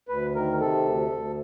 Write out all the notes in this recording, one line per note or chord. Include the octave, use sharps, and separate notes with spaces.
D2 B4
D#3 A#4
C3 A4
D2
D2